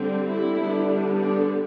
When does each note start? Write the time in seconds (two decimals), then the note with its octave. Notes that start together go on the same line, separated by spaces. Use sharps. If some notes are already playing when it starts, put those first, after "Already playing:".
Already playing: D3 G3 C4
0.26 E4
0.58 D3 G3 B3 D4
1.20 D4